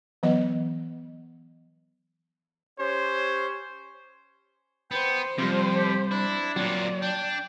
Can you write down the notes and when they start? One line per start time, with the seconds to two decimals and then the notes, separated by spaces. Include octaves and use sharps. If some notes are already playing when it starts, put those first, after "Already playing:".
0.23 E3 F#3 B3 D#5
2.79 C#4 G4 C5 C#5
4.91 B3 C5 G5
5.38 F2 C3 G3 F4
5.76 G4
6.11 D4 E4
6.56 A#2 F#3 C4 D5
7.02 D4 G5